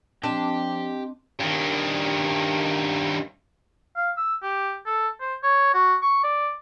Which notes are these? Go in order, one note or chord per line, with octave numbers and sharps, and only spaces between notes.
F3 C4 D4 G4 D#5 G5
G2 D#3
F5
E6
G4
A4
C5
C#5
F#4
C#6
D5